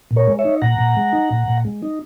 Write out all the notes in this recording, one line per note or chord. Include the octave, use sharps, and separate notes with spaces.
A#2
A#4 C#5
G#3
C#5 E5
D#4
A#2 F#5 A#5
A#2
G#3
D#4
A#2
A#2
G#3
D#4